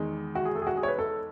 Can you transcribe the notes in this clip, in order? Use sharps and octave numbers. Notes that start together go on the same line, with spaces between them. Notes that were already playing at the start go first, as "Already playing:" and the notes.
Already playing: E2 D#3 G#3
F#4
G#4
A4
G#4
F#4
G#4
C#5
B4
A4